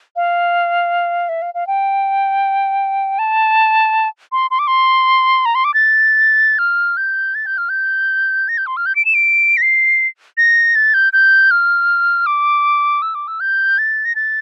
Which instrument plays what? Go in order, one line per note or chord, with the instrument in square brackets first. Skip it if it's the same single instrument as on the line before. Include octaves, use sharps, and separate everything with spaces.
[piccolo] F5
E5
F5
F5
G5
A5
C6
C6
D6
C6
A#5
C6
D6
A6
F6
G6
A6
G6
F6
G6
A#6
G6
C6
F6
G6
D7
E7
D7
A#6
C7
A#6
A6
G6
G6
F6
D6
E6
D6
E6
G6
A6
A#6
A6